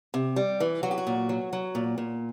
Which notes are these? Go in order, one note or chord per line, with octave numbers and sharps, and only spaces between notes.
C3
G3
E3
F#3 F#4
G4
F#4
A#2
F#3
F#3
A#2
A#2